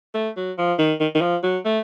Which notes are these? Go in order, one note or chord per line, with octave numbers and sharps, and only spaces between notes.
A3
F#3
F3
D#3
D#3
D#3
F3
F#3
A3